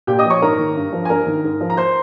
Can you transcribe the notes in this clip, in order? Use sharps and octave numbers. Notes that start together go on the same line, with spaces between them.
A#2 G4 G5
D#5 D#6
F3
C#5 C#6
G#2 A#4 A#5
D#3
G2
F3
G#5
G2 A#4 A#5
D#3
G#2
F3
A#5
C5 C6